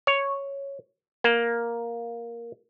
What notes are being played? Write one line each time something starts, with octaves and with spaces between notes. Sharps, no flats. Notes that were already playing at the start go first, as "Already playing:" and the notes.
C#5
A#3